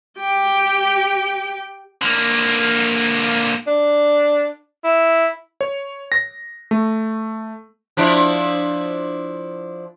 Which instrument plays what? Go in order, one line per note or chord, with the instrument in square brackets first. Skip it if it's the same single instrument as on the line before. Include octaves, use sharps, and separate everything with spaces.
[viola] G4 G5
[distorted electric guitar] D3 A#3
[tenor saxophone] D4
E4
[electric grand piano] C#5
A#6
A3
[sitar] F3 D4 E4